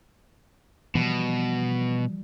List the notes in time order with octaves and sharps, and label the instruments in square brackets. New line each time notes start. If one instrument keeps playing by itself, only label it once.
[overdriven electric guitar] B2 [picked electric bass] E3 F3 G3